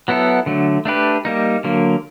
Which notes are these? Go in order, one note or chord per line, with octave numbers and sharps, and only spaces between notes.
F#3 B3 E4 A4
D3 F#3 A3
A3 D4 G4 B4
G3 A#3 D#4
D3 F#3 A#3